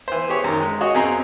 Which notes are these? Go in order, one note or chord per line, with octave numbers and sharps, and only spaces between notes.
E3 C5
G4 G#4 C#5
F#2 D#3
G#3
F#4 G#4 C#5 D#5
F#2 C4 C#4 G#4 A#5 C6